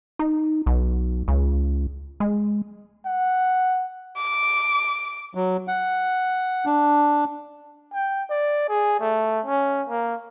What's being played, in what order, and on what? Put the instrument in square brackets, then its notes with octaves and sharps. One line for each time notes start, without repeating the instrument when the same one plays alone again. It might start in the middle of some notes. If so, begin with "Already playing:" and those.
[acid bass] D#4
B1
C#2
G#3
[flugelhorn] F#5
[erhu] D6
[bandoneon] F#3
F#5
D4
[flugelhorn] G5
D5
G#4
A3
C#4
A#3